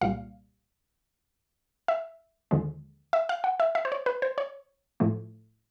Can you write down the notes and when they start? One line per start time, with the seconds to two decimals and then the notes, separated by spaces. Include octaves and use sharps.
0.01 C2 A#2 G3 F5
1.88 E5
2.51 D#2 D3 F3 G#3
3.13 E5
3.29 F5
3.44 F#5
3.60 E5
3.75 E5
3.85 C5
3.92 C#5
4.06 B4
4.22 C5
4.38 C#5
5.00 A2 F3 A3